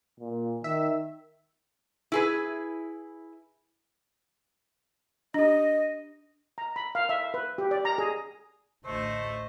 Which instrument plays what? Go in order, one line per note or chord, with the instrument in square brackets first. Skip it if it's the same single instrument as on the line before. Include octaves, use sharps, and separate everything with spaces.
[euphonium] A#2
[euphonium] D#3 [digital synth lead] E5
[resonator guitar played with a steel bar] E4 G#4 B4
[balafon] D4 G4 [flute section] D#5
[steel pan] A#5
B5
F5
E5
B4
G4
D5
A#5
G#4
[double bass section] A1 D2 [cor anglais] A3 [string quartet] C5 D#5